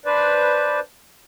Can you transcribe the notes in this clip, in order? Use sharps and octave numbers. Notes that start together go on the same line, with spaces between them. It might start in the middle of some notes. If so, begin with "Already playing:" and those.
D4 B4 C5 D5